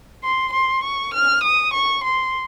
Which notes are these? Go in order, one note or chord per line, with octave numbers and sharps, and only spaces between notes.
C6
C6
C#6
F6
D#6
C#6
C6